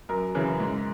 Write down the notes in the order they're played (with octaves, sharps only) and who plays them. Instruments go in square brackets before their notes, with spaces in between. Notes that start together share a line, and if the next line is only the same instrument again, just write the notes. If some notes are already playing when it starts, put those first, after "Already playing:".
[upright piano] F#2 A#4
C#3 E3
G#2